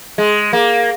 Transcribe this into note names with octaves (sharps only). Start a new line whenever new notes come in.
G#3
A#3